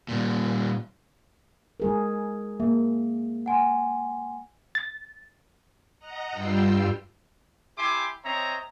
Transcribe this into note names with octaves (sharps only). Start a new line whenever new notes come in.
A#2 G3
G#3 G#4 A#4
A#3 G#4 E5
F#5 G#5 C6
A6
D#5 F#5 A#5
G2 G3 F4 G5 E6 C7
E4 G4 E5 G#5 C6 D6
C4 C#5 D#5 E5 A#5